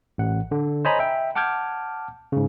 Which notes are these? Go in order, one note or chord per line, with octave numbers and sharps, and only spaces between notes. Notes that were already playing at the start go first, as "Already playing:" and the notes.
A1 F#5
D3
C5 C#5 D#5 G#5 A#5 B5
E5 G5
F#5 A5 D6 F6 G6 G#6
G#2 C#3